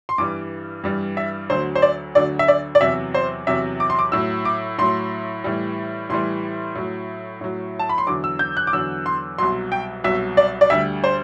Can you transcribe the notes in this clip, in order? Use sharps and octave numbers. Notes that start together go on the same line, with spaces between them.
C6
G2 E3 G3 D6
G2 E3 G3
E5
D2 D3 F#3 C5
C5
D5
D2 D3 F#3 D5
E5
D5
D5
E2 C3 F#3 E5
C5
E2 C3 F#3 E5
D6
C6
D6
A2 F#3 E6
D6
A2 F#3 C6
A2 E3 G3
A2 E3 G3 C6
A2 F#3
A2 F#3
A5
B5
C6
E2 D3 F#3 D6
E6
G6
F#6
D6
E2 D3 F#3 E6
C6
C2 B2 F#3 C6
G5
C2 B2 F#3 E5
D5
D5
D2 D3 G3 E5
C5